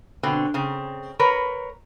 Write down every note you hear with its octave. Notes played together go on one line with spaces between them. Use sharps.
B2 D3 C4
C#3 C4
A#4 B4 C#5